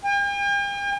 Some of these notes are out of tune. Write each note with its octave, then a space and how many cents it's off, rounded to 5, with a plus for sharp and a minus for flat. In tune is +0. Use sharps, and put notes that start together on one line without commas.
G5 +45